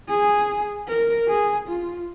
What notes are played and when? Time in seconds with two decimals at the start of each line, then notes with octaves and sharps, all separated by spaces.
0.09 G#4
0.88 A#4
1.28 G#4
1.68 F4